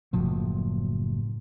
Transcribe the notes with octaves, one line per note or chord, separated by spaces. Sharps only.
F#1 A2 F3 F#3